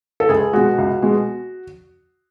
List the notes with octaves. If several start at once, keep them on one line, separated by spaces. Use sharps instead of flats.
A4
C#2 G#4
B2 G#3 F#4
C#2
B2 G#3